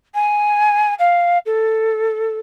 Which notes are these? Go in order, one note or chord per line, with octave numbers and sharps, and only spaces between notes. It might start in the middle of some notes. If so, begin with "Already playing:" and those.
G#5
F5
A4